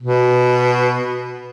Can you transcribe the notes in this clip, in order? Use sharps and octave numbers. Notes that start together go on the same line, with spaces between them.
B2